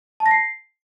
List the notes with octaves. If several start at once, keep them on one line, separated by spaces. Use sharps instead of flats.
A5
A#6
C7